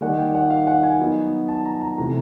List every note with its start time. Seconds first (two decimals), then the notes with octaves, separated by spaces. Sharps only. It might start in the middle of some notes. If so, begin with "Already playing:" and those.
0.01 D#3 G3 A#3 D#4 F#5
0.18 G5
0.35 F#5
0.50 F5
0.67 F#5
0.83 G#5
0.99 F#3 B3 D#4
1.48 A5
1.65 A#5
1.81 A#5
1.98 C3 E3 A3 A#5